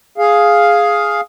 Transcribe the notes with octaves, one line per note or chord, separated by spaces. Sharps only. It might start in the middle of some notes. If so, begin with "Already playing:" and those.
G#4 F5